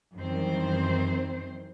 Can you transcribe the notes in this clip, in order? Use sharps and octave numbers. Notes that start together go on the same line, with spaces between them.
F#2 D#3 E3 G3 C4 C5